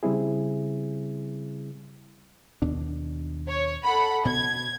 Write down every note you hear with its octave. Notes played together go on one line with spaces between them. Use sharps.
C#3 G3 C4 E4 G#4
D#2 B2 D4
C#5
A4 F#5 B5
B2 G#6